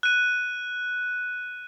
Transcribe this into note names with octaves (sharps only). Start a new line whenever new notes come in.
F#6 D#7